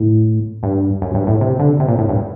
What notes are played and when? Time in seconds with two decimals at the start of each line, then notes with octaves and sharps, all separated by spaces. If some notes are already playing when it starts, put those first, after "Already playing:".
Already playing: A2
0.63 G2
1.02 F#2
1.14 G2
1.27 A2
1.41 C3
1.59 D3
1.80 C3
1.88 A#2
1.98 A2
2.09 G2